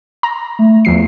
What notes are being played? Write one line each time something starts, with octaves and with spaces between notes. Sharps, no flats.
A#5
A3
E2 F3 C7